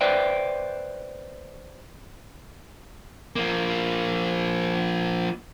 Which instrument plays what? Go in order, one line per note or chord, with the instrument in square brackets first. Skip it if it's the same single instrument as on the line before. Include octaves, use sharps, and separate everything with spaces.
[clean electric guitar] B4 C5 D5 E5 G5
[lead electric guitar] F3 A#3